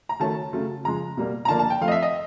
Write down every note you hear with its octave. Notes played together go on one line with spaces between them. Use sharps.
A#5
D#3 F#3 A3 C#4 A5
C#3 F#3 A3
C#3 F3 G#3 A#5
B2 G3 A#3
A#5
D3 F3 A#3 D4 A5
A5
G5
F3 A3 C4 F5
D#5
E5
D#5